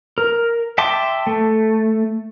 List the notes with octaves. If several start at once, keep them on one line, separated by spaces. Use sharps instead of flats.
A#4
E5 G5 A5 C6 D6
A3